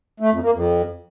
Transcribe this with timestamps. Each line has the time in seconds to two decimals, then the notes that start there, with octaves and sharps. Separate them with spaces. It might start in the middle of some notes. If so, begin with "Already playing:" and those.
0.20 A3
0.31 F2
0.42 A#3
0.53 F2